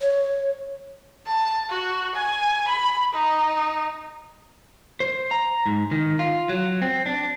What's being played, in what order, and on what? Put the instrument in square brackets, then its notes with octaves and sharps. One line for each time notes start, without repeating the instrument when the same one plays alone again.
[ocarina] C#5
[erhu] A5
F#4
G#5
B5
D#4
[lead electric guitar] C5
A#5
G#2
D#3
F4
F#3
C4
D4